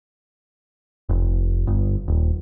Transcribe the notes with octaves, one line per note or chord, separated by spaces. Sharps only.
F1
G1
D#1